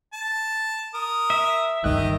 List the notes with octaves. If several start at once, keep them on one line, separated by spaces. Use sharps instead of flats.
A5
A#4 D#6
E5
G1 C#2 D#3 G4 D#5 F#6